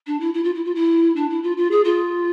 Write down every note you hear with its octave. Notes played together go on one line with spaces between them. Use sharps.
D4
E4
E4
F4
E4
F4
E4
D4
E4
F4
F4
G#4
F4